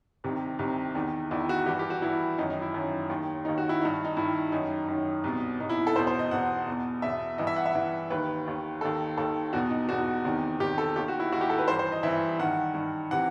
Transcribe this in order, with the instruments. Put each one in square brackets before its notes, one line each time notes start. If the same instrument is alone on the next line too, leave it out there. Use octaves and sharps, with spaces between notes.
[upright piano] C2 C3 D#3
C2 C3 D#3
E2 D#3
E2 D#3 E4
F#4
G2 E3 G4
G4
F#4
G2 E3 E4
F#2 D#3 D#4
D#4
E4
F#2 D#3
D#2 D#3
D#2 D#3 D#4
F#4
E4
D#3 D#4
G2
D#4
G2 D#3 E4
F#2 D#3 D#4
F#2 D#3
C2 B2
C2 B2 D#4
E4
A4
E2 C5
B2
C5
D#5
E2 B2 F#5
E2 B2
E2 B2 E5
G2 E3 D#5
E5
F#5
E5
G2 E3
D#2 D#3 B4
D#2 D#3
D#2 D#3 A4
D#2 D#3 A4
E2 F#4
B2
D#4
E2 B2 F#4
E2 C3 D#3
E2 C3 D#3 G4
A4
D#2 D#3 G4
F#4
E4
D#2 D#3 F#4
G4
A4
B4
G2 E3 C5
C5
D#5
G2 E3 E5
G2 D#3 F#5
G2 D#3
C3 E3 F#5